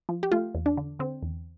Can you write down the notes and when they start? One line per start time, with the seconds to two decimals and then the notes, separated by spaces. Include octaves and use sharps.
0.09 F3
0.23 G4
0.32 A3 F4
0.55 E2
0.66 D4
0.77 D3
0.99 D3 C4
1.23 E2